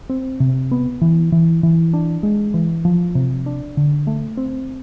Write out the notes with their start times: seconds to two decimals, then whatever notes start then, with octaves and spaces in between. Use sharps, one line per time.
0.10 C4
0.40 C3
0.72 B3
1.02 E3
1.32 E3
1.63 E3
1.94 D4
2.23 G#3
2.54 E3
2.85 F3
3.15 C3
3.46 D4
3.77 D3
4.07 A3
4.37 C4